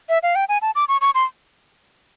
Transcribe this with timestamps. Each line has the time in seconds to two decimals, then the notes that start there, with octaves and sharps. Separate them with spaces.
0.09 E5
0.23 F5
0.35 G5
0.49 G#5
0.62 A5
0.75 D6
0.88 C#6
1.01 C#6
1.15 C6